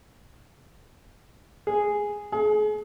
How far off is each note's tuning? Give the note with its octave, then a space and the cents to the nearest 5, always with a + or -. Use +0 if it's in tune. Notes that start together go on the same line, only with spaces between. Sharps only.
G#4 -5
G#4 +35